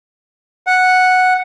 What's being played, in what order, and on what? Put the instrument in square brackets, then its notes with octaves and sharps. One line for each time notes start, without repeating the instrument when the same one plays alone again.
[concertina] F#5